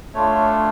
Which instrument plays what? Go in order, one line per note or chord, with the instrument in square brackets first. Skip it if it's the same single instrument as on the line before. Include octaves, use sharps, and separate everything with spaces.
[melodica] A3 D4 F4 C#5